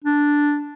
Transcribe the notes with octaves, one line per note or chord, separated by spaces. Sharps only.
D4